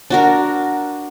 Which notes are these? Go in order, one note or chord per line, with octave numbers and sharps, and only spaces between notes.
D4 F#4 A#4